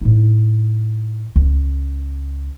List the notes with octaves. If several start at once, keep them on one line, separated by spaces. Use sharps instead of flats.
A2 D#4
C#2